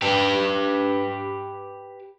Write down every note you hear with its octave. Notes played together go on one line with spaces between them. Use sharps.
G4 B4